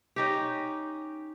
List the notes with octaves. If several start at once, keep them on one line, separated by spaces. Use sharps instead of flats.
C#4 D#4 G4